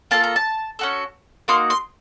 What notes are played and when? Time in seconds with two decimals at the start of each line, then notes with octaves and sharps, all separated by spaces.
0.11 A#3 F4 A4 A5
0.24 A#5
0.36 A5
0.79 C#4 F#4 A4
1.48 A#3 D#4 F#4 C6
1.70 C6